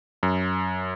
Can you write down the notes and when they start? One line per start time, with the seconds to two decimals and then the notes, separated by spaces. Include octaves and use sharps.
0.23 F#2